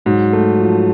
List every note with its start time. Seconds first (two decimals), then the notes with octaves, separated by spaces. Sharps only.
0.06 G#2 F#3
0.33 A3
0.61 F3